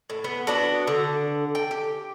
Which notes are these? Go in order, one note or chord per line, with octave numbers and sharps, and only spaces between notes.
A2
B3
B3 D4 F#4
D3
G5
G4